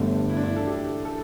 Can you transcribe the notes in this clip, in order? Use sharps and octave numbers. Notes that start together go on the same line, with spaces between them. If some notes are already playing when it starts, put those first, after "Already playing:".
Already playing: G1 G2 D3 A3
E4
D4
E4
A4
G4
A4